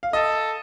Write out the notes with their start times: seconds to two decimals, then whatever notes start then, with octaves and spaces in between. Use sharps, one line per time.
0.03 F5
0.13 A4 D#5